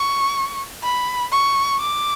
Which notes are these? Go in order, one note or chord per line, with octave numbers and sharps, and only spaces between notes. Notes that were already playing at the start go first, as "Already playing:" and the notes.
Already playing: C#6
B5
C#6
D6